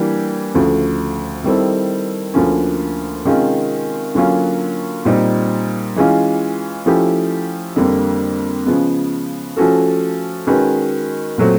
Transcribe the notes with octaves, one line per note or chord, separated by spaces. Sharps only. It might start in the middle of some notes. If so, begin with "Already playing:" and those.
Already playing: E3 G3 A#3 D4 G4
D2 C#3 F3 A3
D#3 G3 C4 E4 A4
D2 D3 F3 A#3 C#4
C3 D#3 G#3 C#4 F4
D3 F#3 A#3 C#4 F4
A#2 G3 C4 D#4
E3 G#3 C#4 F4
F3 A3 C#4 E4 G4
F2 D3 G3 A#3
C#3 F3 G#3 B3
F3 A3 C#4 F#4 A4
D#3 G#3 C#4 F#4 B4
A#2 F#3 A3 C4